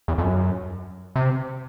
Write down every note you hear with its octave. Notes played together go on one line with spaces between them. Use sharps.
E2
F2
F#2
C3